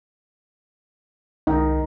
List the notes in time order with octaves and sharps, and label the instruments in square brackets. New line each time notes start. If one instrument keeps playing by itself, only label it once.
[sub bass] C2 [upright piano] D#3 [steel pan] D#4